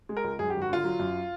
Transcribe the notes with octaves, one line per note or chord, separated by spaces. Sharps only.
G#3
A#4
C#2
F#2 G#4
G4
G#1
F#4
D3 F4
F#3
F#2